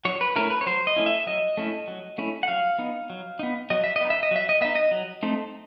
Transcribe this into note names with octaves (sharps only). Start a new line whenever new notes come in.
F#3 C#5
B4
A3 C#4 E4 A#4
B4
C#5
F#3 C5
D#5
A3 C#4 E4
E5
F#3 D#5
A3 C#4 E4
F#3
A3 C#4 E4
F#5
F#3 F5
B3 D#4
F#3
B3 D#4
F#3 D#5
E5
D#5
B3 D#4
E5
D#5
F#3 E5
D#5
B3 D#4 E5
D#5
F#3
A3 C4 D#4